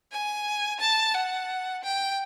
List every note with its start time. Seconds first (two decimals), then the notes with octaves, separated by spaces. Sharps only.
0.12 G#5
0.80 A5
1.14 F#5
1.83 G5